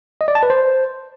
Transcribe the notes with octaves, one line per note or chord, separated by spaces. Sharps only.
D#5
D5
A5
B4
C5